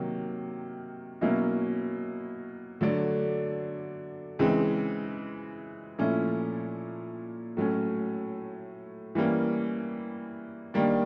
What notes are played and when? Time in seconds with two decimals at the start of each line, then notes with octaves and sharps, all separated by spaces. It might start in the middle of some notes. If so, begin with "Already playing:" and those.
Already playing: C3 D#3 F#3 A#3
1.21 B2 F#3 A#3 C#4 E4
2.81 D3 F#3 A3 D4
4.39 C#3 E3 G#3 C4
5.98 A#2 F3 A3 C#4 E4
7.57 A2 F#3 A3 C#4
9.15 E3 G3 A#3 C#4
10.74 D#3 G3 A#3 D4